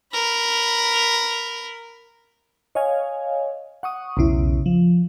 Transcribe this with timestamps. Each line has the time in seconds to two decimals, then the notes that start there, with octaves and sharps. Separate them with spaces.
0.14 A#4 B5
2.75 C#5 D#5 F5 G#5
3.83 F#5 C#6 D#6
4.17 B1 E2 C#3 E4
4.66 F3